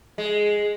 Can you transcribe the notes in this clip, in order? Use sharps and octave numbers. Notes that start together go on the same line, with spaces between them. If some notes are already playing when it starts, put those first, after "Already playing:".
G#3